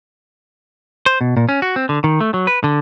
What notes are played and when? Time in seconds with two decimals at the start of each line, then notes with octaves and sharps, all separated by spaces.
1.06 C5
1.21 B2
1.37 A#2
1.49 C#4
1.62 F#4
1.76 C4
1.89 D3
2.04 D#3
2.21 A3
2.34 F#3
2.47 B4
2.64 D3